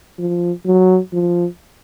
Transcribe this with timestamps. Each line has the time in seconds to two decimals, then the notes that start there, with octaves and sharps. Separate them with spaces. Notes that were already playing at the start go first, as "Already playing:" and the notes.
0.19 F3
0.66 F#3
1.13 F3